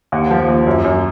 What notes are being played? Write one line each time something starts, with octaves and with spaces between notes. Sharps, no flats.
D#2 F#5
F3
D#2
F#2
F#2